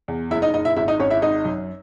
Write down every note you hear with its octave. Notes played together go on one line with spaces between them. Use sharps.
E2
F#1 E4 E5
D#4 D#5
F#1 D#4 D#5
E4 E5
G#1 E4 E5
D#4 D#5
G#1 C#4 C#5
E4 E5
G#1 D#4 D#5
F#2